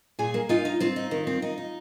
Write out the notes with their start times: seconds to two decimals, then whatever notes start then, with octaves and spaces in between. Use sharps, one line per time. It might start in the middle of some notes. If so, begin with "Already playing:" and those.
0.19 A#2 G#4 G#5
0.34 A#3
0.49 D#4 F4 F5
0.65 D#4
0.80 C4 F4
0.96 D#4
1.11 D#3
1.27 C4
1.42 D#4
1.58 D#4